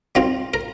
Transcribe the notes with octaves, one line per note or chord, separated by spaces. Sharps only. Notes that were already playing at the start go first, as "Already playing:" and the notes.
D#3 F#3 C4 F4
A#4